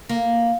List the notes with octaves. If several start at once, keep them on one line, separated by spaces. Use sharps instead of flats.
A#3